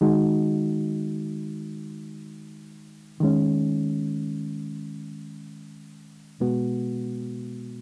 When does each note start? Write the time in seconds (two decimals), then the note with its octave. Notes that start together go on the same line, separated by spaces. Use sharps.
0.01 D#3 G#3 D#4 F#4
3.20 D#3 G#3 C#4
6.40 B2 G#3 B3 F#4